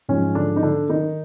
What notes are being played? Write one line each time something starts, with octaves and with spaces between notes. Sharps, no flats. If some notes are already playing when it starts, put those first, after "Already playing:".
G#2 F3 G#3 C#4
D3 D4
D#4
D3 D4
D#3 D#4